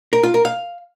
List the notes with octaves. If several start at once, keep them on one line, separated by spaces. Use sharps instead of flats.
A#4
F4
A#4
F5